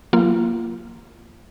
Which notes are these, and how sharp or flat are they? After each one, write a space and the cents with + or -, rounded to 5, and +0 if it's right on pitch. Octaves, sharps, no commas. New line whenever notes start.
F#3 -35 A#3 +0 F4 -30